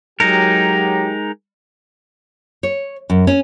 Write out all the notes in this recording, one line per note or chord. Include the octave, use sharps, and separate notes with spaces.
F#3 G#3 D#4 G4 A#4
C#5
F#2
C#4